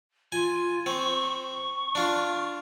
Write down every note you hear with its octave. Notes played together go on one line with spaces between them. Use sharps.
F4 G#5
C4 C#6
C#6
D4 F4